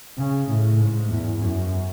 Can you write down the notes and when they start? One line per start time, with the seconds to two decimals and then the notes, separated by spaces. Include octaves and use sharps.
0.18 C#3
0.50 A2
0.80 G#2
1.11 E2
1.42 F#2